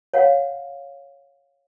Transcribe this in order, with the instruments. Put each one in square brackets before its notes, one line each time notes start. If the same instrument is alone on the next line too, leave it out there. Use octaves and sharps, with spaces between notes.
[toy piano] C#5 F5 F#5